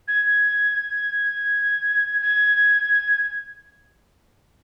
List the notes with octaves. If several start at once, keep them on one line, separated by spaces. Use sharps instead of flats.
G#6
G#6